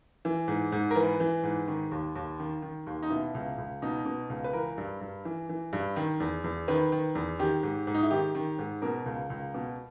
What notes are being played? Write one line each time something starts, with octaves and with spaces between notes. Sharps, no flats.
E3
G#2
G#2
A#4
E3 B4
E3
G#2
D#3
D#2
D#2
D#3
D#3
D#2
D#4
B2 E4
C#2
C#2
B2 D#4
B2
C#2
B4
E3 A#4
G2
G2
E3
E3
G2
D#3
E2
E2
D#3 B4
D#3
E2
D#3 G4
G#2
G#2
D#4
E4
D#3 G4
D#3
G#2
B2 A#4
C#2
C#2
B2